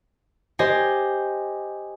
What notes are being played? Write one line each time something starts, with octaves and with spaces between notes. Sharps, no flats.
G4 C5 D#5 G#5